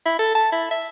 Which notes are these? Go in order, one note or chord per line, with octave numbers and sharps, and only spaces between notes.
E4
A4
A5
E4
E5